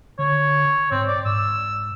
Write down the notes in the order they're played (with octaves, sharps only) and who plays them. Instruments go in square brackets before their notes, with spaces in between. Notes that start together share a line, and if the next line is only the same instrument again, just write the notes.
[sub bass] D3 [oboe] C#5
[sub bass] G#2 [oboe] C4
[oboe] D5
[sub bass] G#2 [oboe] E6